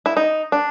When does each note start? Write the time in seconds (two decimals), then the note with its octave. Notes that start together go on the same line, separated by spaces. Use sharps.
0.06 E4
0.17 D#4
0.52 D4